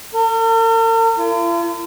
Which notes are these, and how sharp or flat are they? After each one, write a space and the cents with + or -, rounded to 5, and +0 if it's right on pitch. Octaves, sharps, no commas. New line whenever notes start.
A#4 -45
F4 -45